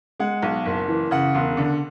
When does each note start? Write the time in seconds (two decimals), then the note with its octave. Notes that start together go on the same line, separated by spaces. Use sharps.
0.20 G#3 F#5
0.43 B1
0.66 F#1
0.88 E3
1.11 C#3 F#5
1.35 E1
1.57 D3